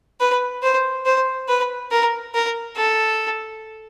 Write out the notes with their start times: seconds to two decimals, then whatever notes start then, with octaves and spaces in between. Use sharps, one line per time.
0.20 B4
0.63 C5
1.06 C5
1.49 B4
1.91 A#4
2.34 A#4
2.77 A4